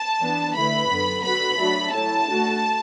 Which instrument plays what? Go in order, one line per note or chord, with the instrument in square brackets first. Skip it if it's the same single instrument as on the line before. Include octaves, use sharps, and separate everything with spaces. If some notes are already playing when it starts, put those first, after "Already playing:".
Already playing: [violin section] A5
[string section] E3 B3 D4 B4
[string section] D3 A3 E4 B4 [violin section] B5
[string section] F#2 D3 B3
[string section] D3 B3 F#4 B4 [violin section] B5
[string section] F#3 A3 D4 F#4 A4
[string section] A2 F#3 A3 E4 [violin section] A5
[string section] D3 A3 F#4